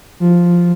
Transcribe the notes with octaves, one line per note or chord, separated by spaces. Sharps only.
F3